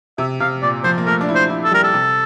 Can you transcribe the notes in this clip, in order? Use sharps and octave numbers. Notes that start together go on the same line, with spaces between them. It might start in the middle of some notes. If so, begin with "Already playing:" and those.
C3 E5
C3 F5
A#2 D5
F3 C5
A#3
A3 A#4
D4
E4
C5
E4
A4
G3 A#4
A4
C3